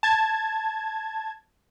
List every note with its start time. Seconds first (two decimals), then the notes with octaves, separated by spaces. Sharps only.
0.03 A5 G#6